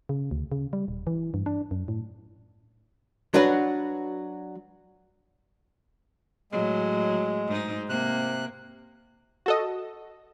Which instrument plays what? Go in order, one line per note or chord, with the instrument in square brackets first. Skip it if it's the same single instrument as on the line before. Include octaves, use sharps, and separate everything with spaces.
[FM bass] C#3
D2
C#3
G3
D#1
E3
G2
D4
F#2
A2
[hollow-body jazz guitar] F#3 D4 F#4 B4
[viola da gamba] A2 F#3 [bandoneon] G#3
[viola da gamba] G#2 D#4
[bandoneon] C3 F#6 [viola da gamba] A#3
[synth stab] F#4 A4 D#5